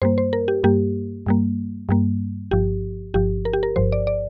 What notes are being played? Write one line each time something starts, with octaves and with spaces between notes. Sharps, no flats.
G2 G3 A#3 C5
C5
A#4
G4
G2 G3 A#3 G4
G2 G3 A#3
G2 G3 A#3
G1 G2 F3 G4
G1 G2 F3 G4
A#4
G4
A#4
G1 G2 F3 C5
D5
D5